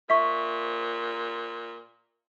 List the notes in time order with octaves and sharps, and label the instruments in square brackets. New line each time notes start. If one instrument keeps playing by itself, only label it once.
[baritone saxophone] A#2 [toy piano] E5 [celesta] C#6 B6